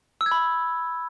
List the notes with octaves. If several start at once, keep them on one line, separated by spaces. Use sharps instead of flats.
E6
G#6
B5